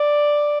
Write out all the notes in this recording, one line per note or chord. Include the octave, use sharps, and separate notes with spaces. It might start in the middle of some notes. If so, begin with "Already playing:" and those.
Already playing: D5